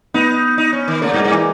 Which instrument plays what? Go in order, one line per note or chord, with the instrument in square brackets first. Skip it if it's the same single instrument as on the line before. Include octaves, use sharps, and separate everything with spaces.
[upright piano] B3 [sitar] D#4
[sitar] D#4
C#4
D#3
[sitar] C#3 [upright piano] A#3
[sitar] G2
[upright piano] G#3
[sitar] G2
[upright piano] E3